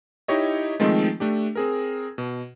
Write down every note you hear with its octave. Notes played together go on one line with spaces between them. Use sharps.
D#4 E4 G4 C#5 D#5
D#3 F3 G#3 A3 C4 D#4
A3 D4 G4
C4 G#4 A#4
B2